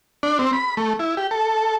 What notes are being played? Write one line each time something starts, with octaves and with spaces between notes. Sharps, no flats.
D4
C4
B5
A3
E4
G4
A4